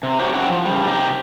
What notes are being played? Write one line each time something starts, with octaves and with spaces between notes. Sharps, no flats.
C3
D#4 F#4 G4 C5 C#5
C#4 E4 F#5 G5
F3
C#3 G3
C3 D#4 G4